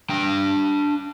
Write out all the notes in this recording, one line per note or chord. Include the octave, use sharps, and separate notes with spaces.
D4 G5